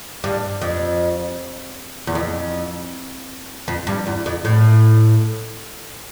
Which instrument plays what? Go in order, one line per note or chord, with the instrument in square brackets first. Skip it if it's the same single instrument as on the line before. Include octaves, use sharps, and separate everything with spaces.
[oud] G2
F2
E2
F2
F2
G2
E2
F2
A2